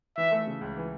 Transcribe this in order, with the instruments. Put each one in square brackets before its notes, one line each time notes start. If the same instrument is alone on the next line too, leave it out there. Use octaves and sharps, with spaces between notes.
[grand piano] E3 [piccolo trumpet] E5
[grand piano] A3
C#3
C#2
E3